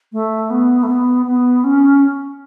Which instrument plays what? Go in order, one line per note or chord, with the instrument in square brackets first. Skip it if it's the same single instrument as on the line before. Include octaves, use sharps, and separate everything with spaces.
[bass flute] A3
B3
A3
B3
B3
C#4